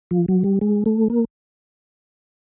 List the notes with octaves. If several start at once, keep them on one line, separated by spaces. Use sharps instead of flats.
F3
F#3
G3
G#3
A3
A#3